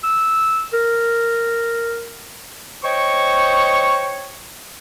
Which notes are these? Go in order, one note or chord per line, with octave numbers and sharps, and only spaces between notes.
E6
A#4
C5 C#5 D#5 G5 C#6